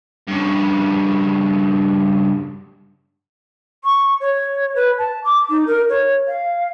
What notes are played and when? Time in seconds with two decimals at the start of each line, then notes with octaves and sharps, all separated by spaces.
0.28 G2 C#3
3.84 C#6
4.21 C#5
4.75 B4
4.98 A5
5.24 D6
5.50 D#4
5.67 A#4
5.89 C#5
6.28 F5